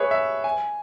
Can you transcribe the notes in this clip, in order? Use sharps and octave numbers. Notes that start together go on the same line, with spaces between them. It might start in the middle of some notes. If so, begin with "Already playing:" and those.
Already playing: G#4 B4 C#5 E5
E5
G#5